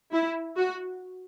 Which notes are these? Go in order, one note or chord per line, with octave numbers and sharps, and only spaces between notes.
E4
F#4